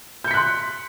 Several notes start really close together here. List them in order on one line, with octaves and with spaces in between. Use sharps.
G6 C#7 B6 F#6 C6